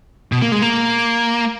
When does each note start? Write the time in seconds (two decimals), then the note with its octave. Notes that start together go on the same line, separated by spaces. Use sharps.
0.32 B2
0.42 A#3
0.52 G#3
0.62 A#3